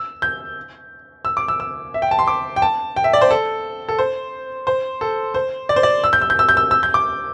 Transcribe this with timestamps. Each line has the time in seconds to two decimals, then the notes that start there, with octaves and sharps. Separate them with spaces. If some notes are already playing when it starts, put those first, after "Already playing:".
Already playing: E6
0.22 G6
1.25 E6
1.37 D6
1.48 E6
1.60 E6
1.94 E5
2.02 G5
2.11 A5
2.19 C6
2.28 D6
2.56 G5
2.62 A5
2.96 G5
3.04 E5
3.13 D5
3.21 C5
3.31 A4
3.89 A4
3.99 C5
4.67 C5
5.01 A4
5.34 C5
5.69 D5
5.76 C5
5.83 D5
6.04 E6
6.13 G6
6.22 E6
6.30 G6
6.39 E6
6.49 G6
6.57 E6
6.71 E6
6.83 G6
6.94 D6